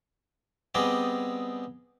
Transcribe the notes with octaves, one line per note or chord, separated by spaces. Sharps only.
G3 B3 C4 G#4 D5 D#5